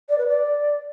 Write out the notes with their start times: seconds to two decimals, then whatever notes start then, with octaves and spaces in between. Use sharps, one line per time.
0.09 D5
0.18 B4
0.28 D5